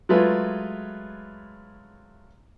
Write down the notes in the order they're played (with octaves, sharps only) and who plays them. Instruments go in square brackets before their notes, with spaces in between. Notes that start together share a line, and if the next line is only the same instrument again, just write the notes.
[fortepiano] F#3 G#3 A3 F4 B4